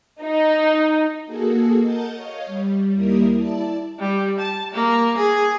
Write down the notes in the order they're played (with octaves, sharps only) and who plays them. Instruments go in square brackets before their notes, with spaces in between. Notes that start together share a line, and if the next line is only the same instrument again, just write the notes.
[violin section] D#4
[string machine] A#3 F#4 G#4 A4
A#4 D#5 F#5 A5 G6 A6
C#5 D#5 F5
G3
D#2 G3 A#3 E4 A#4 D#6
E4 D5 A5
[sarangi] G3
A5
A#3
G#4